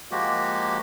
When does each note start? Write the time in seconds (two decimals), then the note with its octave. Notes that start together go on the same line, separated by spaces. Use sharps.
0.11 F3 G#3 A#3 F#4 G4